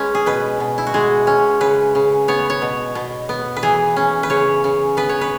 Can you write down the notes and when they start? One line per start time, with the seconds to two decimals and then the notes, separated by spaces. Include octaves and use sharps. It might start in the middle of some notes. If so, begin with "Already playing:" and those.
Already playing: G#3 C#4 B4 C#5
0.15 G#4
0.26 B2 B4
0.60 B2
0.78 E4
0.87 F#4
0.94 G#3 G#4
1.27 C#4
1.61 C#3 B4
1.95 C#3
2.28 B3 C#5
2.50 C#5
2.62 B2
2.95 B2
3.29 B3
3.57 B4
3.63 E3 G#4
3.96 C#4
4.23 B4
4.30 C#3 C#5
4.64 C#3
4.97 B3 B4
5.09 C#5
5.21 B4